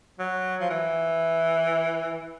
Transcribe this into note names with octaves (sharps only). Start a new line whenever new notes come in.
F#3
F3
E3